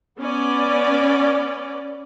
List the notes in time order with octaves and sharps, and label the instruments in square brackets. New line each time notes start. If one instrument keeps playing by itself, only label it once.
[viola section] B3 C#4 D5